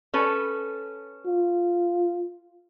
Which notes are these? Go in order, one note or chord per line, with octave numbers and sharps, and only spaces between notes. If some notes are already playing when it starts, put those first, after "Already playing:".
C#4 A4 B4
F4